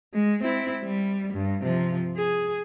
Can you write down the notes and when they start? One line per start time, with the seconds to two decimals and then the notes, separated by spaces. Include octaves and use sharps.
0.14 G#3
0.43 C4 E4
0.83 G3
1.33 G2
1.63 C3 F3
2.17 G#4